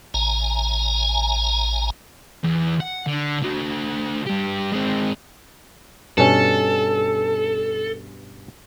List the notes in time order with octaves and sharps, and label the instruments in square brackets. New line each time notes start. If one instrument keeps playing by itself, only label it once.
[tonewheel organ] A1 G#5 A#5
[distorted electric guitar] E2
F#5
D3
D3 F#4
G2 G4
G#3 C4
[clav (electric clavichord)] G2 B2 C#4 [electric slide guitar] A4